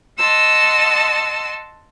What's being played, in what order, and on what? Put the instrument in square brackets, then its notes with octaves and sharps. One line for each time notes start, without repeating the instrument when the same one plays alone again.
[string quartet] D#5 F#5 A5 C6 E6